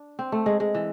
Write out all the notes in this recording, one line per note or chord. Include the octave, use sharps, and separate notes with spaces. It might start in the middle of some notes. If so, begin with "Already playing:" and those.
Already playing: D4
C4
A3
G#3
G#3
E3